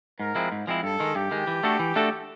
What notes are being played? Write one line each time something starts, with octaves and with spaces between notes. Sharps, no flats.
G#2 A#4
F3 G#3 C4 E4
G#2
F3 G#3 C4 E4
G2 A4
D#3 G#3
G2 G4
D#3 G#3
E3
A3 D4 F#4 A4
E3
A3 D4 F#4 A4